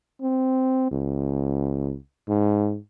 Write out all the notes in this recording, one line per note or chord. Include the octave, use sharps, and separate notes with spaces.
C4
C#2
G#2